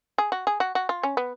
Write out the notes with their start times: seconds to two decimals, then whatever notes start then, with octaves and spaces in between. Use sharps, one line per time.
0.18 G#4
0.32 F#4
0.47 G#4
0.60 F#4
0.75 F#4
0.89 F4
1.03 C#4
1.17 B3